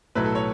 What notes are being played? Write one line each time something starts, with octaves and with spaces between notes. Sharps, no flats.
B1 A2 F#3 A3 B4
A4
C#5